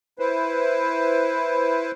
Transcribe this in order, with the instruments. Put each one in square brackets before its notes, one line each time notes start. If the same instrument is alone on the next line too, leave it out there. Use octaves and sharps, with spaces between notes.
[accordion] E4 B4 C5